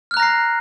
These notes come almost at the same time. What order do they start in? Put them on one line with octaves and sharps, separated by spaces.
F6 F#6 A#5 A#6 C7